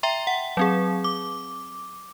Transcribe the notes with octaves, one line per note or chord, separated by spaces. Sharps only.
E5 G5 A#5 C6
F#5
F#3 C4 G#4
D6